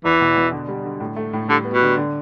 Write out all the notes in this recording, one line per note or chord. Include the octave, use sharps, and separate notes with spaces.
E2 E3
B2
B2
D3
G3
D3
A2
A3
A2
D3 G3
B3
B2
D3
D3